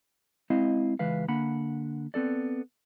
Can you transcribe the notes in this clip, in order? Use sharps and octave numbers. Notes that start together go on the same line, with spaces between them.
G#3 C4 E4 D#5 F5
C#2 E3 G#3 B4 F5
D3 A#3 F#5 B5
B3 C4 A4 D5